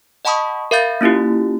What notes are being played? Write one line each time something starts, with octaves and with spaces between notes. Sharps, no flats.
D#5 F#5 A5 B5 C#6 D#6
A#4 E5 F5 B5 G6 A6
A#3 C#4 E4 F4 G4